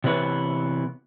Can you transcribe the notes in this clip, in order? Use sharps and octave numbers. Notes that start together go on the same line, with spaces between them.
C3 E3 B3 B4 C#5